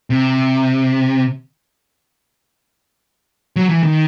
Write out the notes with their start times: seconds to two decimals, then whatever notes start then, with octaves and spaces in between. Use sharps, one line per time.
0.10 C3
3.56 F#3
3.69 E3
3.83 D#3